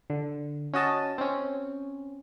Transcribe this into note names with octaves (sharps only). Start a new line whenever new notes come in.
D3
C#4 F#4 D#5 A5
C4 C#4